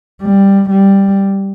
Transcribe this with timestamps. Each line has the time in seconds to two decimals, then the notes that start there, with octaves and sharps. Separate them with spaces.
0.22 G3
0.71 G3